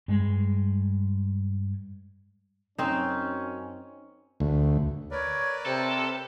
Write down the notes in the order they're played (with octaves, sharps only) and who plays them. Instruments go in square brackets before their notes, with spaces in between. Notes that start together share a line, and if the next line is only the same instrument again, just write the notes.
[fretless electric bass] G2 G#3
[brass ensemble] F#2 C#4 [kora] C4 D#4
[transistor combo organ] D2
[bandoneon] A#4 B4 D5 [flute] C#5
[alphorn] C3 [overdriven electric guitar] A4 [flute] C5